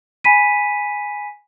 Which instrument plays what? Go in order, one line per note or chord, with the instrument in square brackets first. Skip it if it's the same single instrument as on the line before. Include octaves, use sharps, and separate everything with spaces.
[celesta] G#5 B5 B6 D#7